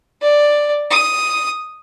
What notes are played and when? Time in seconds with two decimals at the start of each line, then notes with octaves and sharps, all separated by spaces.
0.21 D5
0.90 D#6